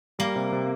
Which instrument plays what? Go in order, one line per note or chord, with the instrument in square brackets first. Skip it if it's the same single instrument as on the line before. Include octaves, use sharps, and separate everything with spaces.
[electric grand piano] G3 [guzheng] A#3
[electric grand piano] C3
C3